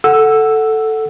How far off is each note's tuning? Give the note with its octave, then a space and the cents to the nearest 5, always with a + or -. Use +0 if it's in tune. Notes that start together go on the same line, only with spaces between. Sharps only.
A4 +0 F#5 +0 E6 +5